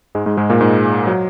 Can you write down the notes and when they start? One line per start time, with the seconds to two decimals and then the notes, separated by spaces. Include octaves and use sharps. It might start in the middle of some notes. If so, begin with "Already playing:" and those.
0.15 G#2 G#3
0.26 G#2 G#3
0.37 G#2 G#3
0.50 A#2 A#3
0.61 G#2 G#3
1.07 F#3